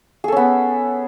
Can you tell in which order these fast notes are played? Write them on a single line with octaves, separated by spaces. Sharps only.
G#4 A4 C#4 B3